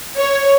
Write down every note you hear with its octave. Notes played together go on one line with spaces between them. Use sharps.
C#5